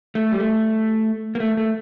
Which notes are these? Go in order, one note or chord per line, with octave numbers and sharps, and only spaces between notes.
A3
G3
A3
A#3
A3
A3